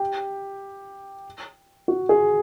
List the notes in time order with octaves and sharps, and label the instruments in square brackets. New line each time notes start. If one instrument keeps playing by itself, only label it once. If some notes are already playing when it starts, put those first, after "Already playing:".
Already playing: [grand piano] G4
F#4
G#4